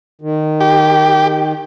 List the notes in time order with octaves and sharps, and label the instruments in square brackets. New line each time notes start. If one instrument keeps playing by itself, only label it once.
[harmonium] D#3
[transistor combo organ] G4